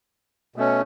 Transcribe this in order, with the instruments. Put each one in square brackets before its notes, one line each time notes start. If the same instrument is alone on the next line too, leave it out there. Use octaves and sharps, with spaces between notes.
[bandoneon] B2 A3 C#4